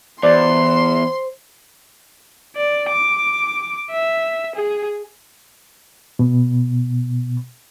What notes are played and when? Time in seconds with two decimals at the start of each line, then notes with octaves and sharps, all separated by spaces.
0.23 E2 C5 D5 C6
2.56 D5
2.89 D6
3.91 E5
4.55 G#4
6.19 B2